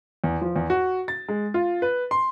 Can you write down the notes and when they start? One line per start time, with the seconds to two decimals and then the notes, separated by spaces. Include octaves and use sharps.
0.24 E2
0.41 F3
0.56 E2
0.70 F#4
1.08 A6
1.28 G#3
1.54 F4
1.82 B4
2.11 C6